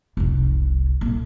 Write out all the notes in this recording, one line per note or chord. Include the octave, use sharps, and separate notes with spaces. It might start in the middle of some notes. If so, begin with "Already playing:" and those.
F1 C2
A2 A#3